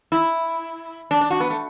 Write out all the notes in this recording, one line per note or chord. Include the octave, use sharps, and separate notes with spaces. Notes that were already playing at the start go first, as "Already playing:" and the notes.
E4
D4
D4
F#4
B3
A3